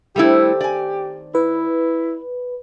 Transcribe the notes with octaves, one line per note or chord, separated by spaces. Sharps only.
D#3 G3 A3 C4 D4 E4 G4
D5 G#5
E4 B4